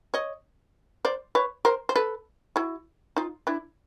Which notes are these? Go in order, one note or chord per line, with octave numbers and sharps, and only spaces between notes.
C#5 D#5
C5 D5
B4 C#5
A#4 C5
C5
A4 B4
E4 F#4
D#4 F4
D4 E4